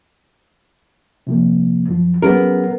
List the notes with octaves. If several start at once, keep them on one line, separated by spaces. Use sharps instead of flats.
C3 F3 A#3
F#2 F3
F#3 B3 C#4 G#4 A#4